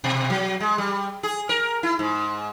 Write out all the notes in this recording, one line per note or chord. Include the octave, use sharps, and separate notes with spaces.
B2
F#3
G#3
G3
G#4
A#4
E4
G#2